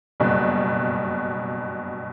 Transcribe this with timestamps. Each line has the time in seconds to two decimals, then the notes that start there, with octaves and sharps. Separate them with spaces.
0.20 F#1 G2 B2